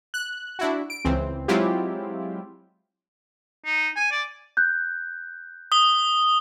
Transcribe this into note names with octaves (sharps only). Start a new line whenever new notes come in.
F#6
D4 E4 F#4
D7
C#2 E3 C4
F#3 G#3 C4 E4 F4 G4
D#4
G#5
D5
F#6 G6
D#6 G7